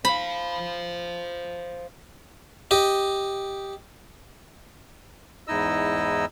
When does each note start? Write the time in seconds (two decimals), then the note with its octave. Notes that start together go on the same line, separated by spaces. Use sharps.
0.05 C5 F5 B5
2.71 G4 D#5
5.47 E2 G#2 D#4 E4 D#5 E6